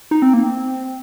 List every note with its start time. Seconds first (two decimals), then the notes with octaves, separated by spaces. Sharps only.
0.11 D#4
0.22 C4
0.34 A#3
0.44 C4